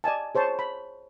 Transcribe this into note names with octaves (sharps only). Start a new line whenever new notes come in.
D5 D#5 G#5 A5
G#4 C5 C#5 A5
B5